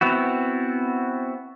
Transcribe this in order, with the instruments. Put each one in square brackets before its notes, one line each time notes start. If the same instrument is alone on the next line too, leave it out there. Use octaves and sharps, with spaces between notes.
[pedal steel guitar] B3 C4 E4 F#4